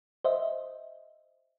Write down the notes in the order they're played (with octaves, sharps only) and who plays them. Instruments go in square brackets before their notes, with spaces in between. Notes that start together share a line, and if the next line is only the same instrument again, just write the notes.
[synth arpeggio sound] C5 D#5 E5